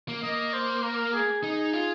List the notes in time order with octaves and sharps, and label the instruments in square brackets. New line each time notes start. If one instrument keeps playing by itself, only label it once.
[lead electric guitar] A#3
[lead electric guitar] A#3 [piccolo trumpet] D#5
[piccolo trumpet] C5
A#4
G#4
[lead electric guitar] D#4 [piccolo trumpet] G#4
[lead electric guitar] F4